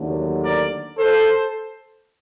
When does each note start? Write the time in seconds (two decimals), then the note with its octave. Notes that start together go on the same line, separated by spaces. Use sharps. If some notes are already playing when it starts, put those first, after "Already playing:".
Already playing: D#2 D3 F#3 A3
0.43 A#4 D5
0.98 A4 C5